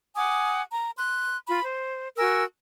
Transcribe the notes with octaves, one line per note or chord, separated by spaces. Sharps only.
F#5 G#5 D6 D#6
A#5
C6 F#6
F4 B5
C5
F#4 A#4 G#5 E6